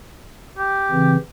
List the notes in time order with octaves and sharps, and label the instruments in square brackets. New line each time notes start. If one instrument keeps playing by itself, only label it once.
[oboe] G4
[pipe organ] C#3 E3 C4